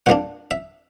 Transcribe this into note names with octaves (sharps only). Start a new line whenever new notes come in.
A#2 G3 A#3 D4 F#5
E5